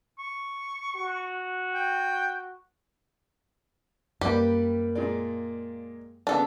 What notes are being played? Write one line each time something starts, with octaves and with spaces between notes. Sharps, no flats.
C#6
F#4
G5
F#2 G3 A#3 G4 B4 D5
A#2 G#3 D5
C#3 B3 D4 A4